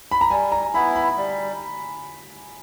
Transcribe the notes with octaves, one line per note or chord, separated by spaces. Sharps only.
B5
A#5
G3 G#5
A#5
B3 E4 B5
B5
G3